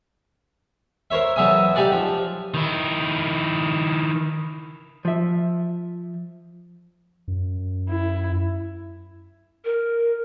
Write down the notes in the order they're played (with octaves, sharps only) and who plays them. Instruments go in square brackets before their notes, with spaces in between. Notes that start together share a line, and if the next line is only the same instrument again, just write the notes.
[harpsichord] A#4 C5 C#5 E5
E2 F#3 E5 G#5 D#6
D#4 G4 G#4 D5 F#5
F3
[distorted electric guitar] D#3 E4
[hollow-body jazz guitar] F3 E5
[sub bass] F#2
[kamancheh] E4
[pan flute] A#4